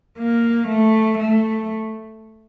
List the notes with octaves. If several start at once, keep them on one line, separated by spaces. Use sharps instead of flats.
A#3
A3
A3